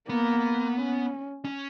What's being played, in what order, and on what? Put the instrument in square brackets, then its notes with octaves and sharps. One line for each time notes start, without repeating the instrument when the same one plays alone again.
[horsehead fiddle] A#3 [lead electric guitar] B3
[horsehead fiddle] C#4
[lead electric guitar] C#4